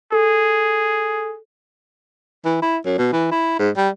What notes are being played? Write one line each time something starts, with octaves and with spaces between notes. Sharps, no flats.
G#4 A4
E3
E4
F#2
B2
E3
E4
G#2
G3